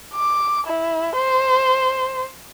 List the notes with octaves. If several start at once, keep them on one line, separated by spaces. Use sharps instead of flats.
D6
E4
C5